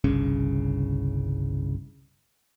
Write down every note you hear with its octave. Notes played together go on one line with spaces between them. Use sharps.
G1 C2 C#3 C#4